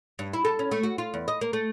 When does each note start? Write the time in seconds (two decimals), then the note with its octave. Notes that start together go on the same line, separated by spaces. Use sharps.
0.19 G2
0.33 E4
0.45 A4
0.59 C#4
0.71 A3
0.83 F#4
0.98 F4
1.14 E2
1.28 D#5
1.41 A#3
1.53 A3